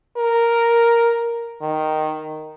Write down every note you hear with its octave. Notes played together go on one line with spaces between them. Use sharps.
A#4
D#3